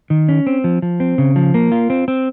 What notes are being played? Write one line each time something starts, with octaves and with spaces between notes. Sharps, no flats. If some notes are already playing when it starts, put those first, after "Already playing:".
D#3
C#4
C4
F3
F3
C4
C#3
F3
A#3
F4
C4
C4